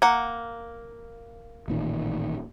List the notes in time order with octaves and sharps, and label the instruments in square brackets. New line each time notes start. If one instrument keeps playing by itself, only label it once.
[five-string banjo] A#3 F#5
[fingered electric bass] A1 A#2 D#3